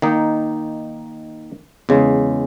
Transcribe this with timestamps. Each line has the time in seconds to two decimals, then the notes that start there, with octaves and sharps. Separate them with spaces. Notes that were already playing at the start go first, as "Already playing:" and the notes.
0.02 D#3 A#3 D#4
1.89 E2 C#3 G#3